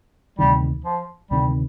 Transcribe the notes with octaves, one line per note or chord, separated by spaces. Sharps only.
D2 C3 D#3 G3
F3
D2 C3 D#3 G3